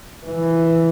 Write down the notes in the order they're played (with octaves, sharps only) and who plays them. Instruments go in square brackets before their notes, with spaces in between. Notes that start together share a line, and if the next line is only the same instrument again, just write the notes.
[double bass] E3